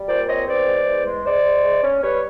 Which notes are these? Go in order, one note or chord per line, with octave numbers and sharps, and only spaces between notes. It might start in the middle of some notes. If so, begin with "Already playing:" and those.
Already playing: G3
A#2 C5 D5
C4 C#5 D#5
E2 C5 D5
G#3
E2
G#3
G#3 C5 D5
G#3
G#3
C#4
G3 B4 C#5